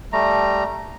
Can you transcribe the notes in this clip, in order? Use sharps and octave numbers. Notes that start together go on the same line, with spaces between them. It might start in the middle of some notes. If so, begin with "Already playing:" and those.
G3 A3 A#5